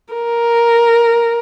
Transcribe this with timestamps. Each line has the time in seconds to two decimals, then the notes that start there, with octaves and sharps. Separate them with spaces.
0.14 A#4